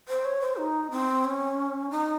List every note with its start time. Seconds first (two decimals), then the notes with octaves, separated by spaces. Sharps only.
0.08 C5
0.25 C#5
0.42 C5
0.58 D#4
0.91 C4
1.25 C#4
1.91 D#4